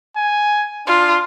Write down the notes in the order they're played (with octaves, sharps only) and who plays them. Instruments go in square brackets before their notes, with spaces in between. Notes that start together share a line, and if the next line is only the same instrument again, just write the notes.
[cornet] G#5
[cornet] D4 [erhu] F4